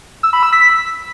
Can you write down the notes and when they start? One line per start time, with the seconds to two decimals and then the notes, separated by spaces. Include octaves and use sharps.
0.23 E6
0.33 B5
0.43 E6
0.53 B6